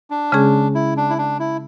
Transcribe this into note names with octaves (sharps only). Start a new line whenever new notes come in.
D4
C#3 G#3 C#4 G#4
E4
D4
E4
D4
E4